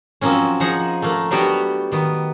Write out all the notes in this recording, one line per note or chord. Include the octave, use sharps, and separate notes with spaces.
F3 F#3 A#3 C4 C#4
F3 D#4 G#4 F#5 A#5
A3 A#3
F#3 G3 B3 D4 F#4 G4
D#3 B3